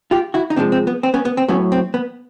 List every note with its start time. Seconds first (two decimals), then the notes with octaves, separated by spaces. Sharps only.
0.11 F4 G4
0.34 E4 F#4
0.50 D#4
0.56 C3 F3 G#3 C4 D4
0.72 C4
0.87 B3
1.03 C4
1.14 B3 C#4
1.25 B3
1.37 C4
1.48 A2 F#3 B3 C#4
1.72 C4
1.94 B3